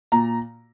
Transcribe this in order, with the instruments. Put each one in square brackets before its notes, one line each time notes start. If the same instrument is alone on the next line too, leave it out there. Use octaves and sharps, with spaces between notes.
[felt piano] A#2 A#5